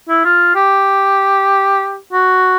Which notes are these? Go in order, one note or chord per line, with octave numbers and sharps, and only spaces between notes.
E4
F4
G4
F#4